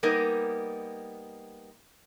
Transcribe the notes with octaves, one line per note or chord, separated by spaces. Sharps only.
G3 A#3 B3 D#4 A#4